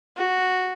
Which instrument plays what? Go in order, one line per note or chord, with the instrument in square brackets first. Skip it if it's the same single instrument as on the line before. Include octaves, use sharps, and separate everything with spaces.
[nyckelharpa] F#4